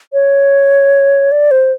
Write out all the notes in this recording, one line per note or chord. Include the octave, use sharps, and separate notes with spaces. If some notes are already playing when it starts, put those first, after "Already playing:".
C#5
D5
C5